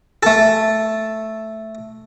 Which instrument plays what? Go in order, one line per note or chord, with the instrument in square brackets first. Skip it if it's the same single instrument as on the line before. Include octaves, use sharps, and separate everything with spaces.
[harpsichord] A3 A4